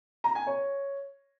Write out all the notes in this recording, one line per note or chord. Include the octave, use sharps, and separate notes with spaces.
A#5
G#5
C#5